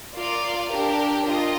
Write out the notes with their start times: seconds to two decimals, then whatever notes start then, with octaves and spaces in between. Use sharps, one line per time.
0.14 F4 A#4 D5 F5
0.70 D4 G4 A#4
1.26 F4 A#4 D#5